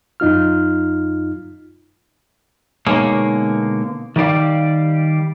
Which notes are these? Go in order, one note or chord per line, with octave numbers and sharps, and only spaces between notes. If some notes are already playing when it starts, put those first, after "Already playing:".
F#2 D#4 F4 F6
B2 D3 G#3 A#3 D#4 C#5
D#3 G3 G4 D5 F5